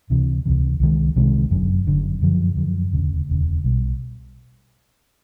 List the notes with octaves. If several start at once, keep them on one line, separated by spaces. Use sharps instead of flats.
C#2 C3 E3
C#2 C3 E3
C2 C3 D#3 G#3
C2 C3 D#3 G#3
G1 F#2 D3
G1 F#2 D3
F#2 D3 F3
F#2 D3 F3
E1 D2 C#3
E1 D2 C#3
B1 B2 G3